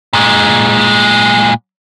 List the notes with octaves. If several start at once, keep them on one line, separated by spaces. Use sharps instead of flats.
A#2 G#3